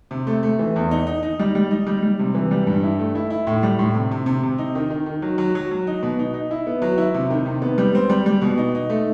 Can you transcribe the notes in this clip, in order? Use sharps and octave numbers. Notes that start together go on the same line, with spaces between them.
C3
A3
A3
E3
E2
D#4
D#4
D#4
G3
G3
D#4
G3
G3
C3
E3
G3
G2
E4
A3
E4
E4
A2
G3
A2
C3
C3
C3
C3
D#4
D#3
D#3
D#3
F#3
F#3
F#3
F#3
D#4
B2
D#4
D#4
E4
B3
F#3
E4
C3
D#3
C3
B3
G3
C4
G3
G3
B2
D#4
D#4
A3